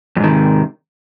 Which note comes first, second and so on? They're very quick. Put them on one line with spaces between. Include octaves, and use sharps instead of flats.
F2 G#2 D#3 C3